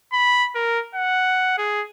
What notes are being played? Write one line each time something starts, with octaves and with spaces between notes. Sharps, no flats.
B5
A#4
F#5
G#4